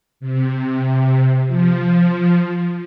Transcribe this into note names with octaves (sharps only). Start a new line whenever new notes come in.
C3
F3